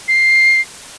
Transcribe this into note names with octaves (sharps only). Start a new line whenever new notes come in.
C7